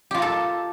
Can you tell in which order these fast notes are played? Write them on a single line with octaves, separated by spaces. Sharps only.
G4 F4 A#5 A4